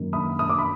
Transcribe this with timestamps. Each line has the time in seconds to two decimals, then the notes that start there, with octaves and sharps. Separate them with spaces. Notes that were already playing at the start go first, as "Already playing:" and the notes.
Already playing: F#2 D#3 A#3
0.13 B5 D#6
0.39 D#6
0.49 D6
0.58 B5